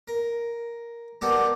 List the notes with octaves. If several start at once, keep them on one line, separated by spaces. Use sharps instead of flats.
A#4
G3 A#3 B3 F#4 G4 A4